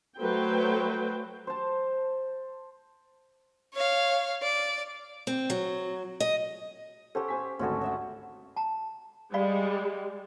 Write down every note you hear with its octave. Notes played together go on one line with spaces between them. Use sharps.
F#3 A3 B4 C5 G5
C5 A5
C#5 F5
D5
C4
F#3
D#5
C#4 G4 A4 C5 F#5
C5 G#5 B6
G#1 D2 C#4 F#4 A4
C#4 E5 F#5
A5 A#5
G3 G#3 D5 F5 B5